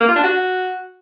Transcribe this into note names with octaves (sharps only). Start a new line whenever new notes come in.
A#3
F4
D4
F#4